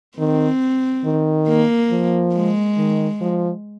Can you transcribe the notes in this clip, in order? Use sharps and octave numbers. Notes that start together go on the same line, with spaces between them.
D#3 C4
D#3
A#3
F3
G#3
D#3
F3